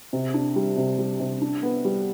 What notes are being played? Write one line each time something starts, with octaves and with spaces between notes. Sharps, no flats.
C3
D4
G3
C3
G3
C3
D4
B3
G3